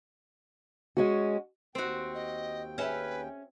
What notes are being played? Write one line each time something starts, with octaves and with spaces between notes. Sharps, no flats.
G#3 C#4 F#4
D#2 C4 F#4 G5
D#5
C#4 G#4 B4 E5